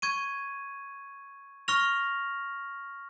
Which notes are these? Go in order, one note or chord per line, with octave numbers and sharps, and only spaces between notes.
C#6 G#6 D#7
C#6 F6 A#6 F7